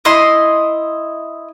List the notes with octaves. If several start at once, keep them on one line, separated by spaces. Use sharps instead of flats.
E4 D#5 C6